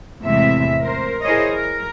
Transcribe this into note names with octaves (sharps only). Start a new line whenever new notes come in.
E2 A2 C3 E3 G#3 E5
A#4 C5
E4 G#4 A#4 C5 C#5 D#5
A#4